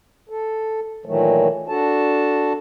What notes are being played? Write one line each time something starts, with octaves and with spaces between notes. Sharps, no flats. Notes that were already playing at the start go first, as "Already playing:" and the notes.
A4
A#2 D#3 E3 F#3 A3
D4 F#4 A4 A5